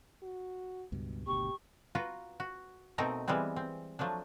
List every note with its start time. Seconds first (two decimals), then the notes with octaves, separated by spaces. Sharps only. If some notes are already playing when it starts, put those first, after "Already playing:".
0.23 F#4
0.92 C#2 G2 B2
1.27 G#1 D2 B2 G4 C#6
1.95 F4 F#4 B4 A#5
2.40 F#4
2.98 B2 A3 C4 D#4 A#4 A#5
3.28 E3 G3 G#3 B3 C4
3.56 C4
3.99 F3 F#3 A3 D4